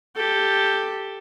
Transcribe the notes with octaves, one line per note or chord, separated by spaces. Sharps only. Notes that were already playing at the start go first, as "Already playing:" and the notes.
G4 A4